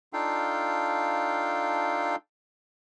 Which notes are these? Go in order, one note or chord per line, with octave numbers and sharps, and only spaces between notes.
D4 D#4 F4 A4 F5 G5